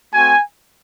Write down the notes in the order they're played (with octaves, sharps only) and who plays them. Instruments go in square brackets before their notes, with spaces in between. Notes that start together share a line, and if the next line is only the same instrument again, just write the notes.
[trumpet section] A3 C4 F#4 G#5